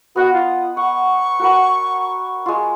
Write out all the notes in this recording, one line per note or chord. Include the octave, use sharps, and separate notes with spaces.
B3 F#4 D#5 F#5
F4
F#5 C#6
F#4 A#4 B4
G#3 F4